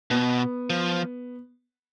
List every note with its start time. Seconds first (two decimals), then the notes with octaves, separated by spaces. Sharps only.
0.11 B2 B3
0.70 F3